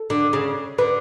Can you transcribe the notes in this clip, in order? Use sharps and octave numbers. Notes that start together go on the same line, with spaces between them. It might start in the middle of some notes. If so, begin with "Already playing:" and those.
Already playing: A4
D3
C#3
D3 B4